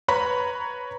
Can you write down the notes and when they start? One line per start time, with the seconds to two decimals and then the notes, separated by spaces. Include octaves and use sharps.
0.08 B4 C#5 A#5 B5